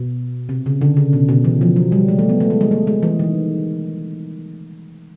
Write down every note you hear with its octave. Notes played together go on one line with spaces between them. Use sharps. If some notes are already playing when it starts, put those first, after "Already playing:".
Already playing: B2
C3
C#3
D3
C#3
B2
B2
E3
F3
F#3
G3
G#3
A3
B3
A3
G#3
G#3
A3
G#3
E3
D#3